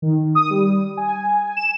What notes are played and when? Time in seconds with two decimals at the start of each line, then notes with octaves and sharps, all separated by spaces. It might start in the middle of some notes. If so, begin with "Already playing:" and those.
0.02 D#3
0.35 D#6
0.50 G3
0.97 G#5
1.57 E7